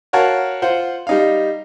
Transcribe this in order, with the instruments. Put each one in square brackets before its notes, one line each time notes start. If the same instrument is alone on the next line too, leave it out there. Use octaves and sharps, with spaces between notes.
[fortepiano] F#4 A#4 C#5 F5 F#5 A5
F4 C5 F#5
G3 D#4 F5